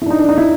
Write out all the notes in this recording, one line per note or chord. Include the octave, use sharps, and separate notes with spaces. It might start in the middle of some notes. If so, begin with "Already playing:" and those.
E4
D4
D#4
D4
D#4
E4